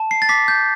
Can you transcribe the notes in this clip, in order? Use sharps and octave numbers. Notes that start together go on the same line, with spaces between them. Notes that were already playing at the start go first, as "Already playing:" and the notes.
Already playing: A5
C7
A6
D6 B6
G6